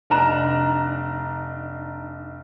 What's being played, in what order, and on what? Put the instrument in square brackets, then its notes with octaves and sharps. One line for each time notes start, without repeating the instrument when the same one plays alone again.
[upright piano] F1 D4 D#4 A#5 F#6 E7